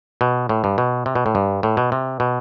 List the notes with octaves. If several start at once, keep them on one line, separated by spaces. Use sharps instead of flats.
B2
A2
G2
B2
C3
B2
A2
G2
A2
B2
C3
B2